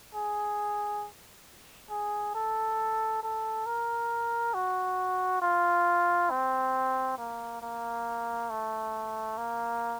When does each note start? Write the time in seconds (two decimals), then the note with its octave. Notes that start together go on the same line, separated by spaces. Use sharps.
0.15 G#4
1.90 G#4
2.35 A4
3.23 A4
3.66 A#4
4.54 F#4
5.42 F4
6.30 C4
7.18 A#3
7.62 A#3
8.50 A3
9.38 A#3